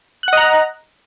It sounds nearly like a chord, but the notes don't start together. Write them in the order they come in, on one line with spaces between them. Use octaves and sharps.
F#6 F#5 D#5 A#5